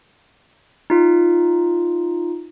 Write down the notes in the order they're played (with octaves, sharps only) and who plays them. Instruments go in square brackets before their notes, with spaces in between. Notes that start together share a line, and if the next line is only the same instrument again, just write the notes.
[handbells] D#4 F4